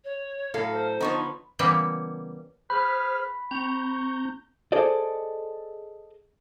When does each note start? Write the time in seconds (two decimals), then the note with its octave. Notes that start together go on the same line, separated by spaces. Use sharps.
0.04 C#5
0.54 A2 F#3 A4 F5
0.72 C5
1.01 D3 F3 B3 D#4 C#5 D#6
1.59 C#3 E3 G3 A#3 B3
2.70 G#4 B4 C5 B5 F6
3.51 C4 A#5 C#6 G6
4.72 G#4 A4 C5 D5 D#5